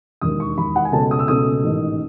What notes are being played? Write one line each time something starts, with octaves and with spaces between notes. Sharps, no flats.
E1 D#2 D#3 D#6
C#6
E1 D#2 D#3 B5
F#5
G#5
C#2 B2 A3 C#4 A5
D#6
E6
C#2 B2 A3 C#4 D#6
A1 G#2 D#3